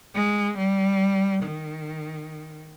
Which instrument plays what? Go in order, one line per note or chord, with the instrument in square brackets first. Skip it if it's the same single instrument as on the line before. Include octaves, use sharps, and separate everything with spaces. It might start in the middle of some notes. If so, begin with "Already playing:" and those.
[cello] G#3
G3
D#3